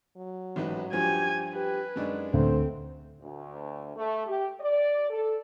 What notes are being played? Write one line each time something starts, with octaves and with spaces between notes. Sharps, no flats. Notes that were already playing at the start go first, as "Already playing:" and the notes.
F#3
A1 G#2 B4
G2 F3 G4 G#5
G4 B4
F#2 G#3 D4 D#4
D2 C4 C5
D2
A3
G4
D5
A4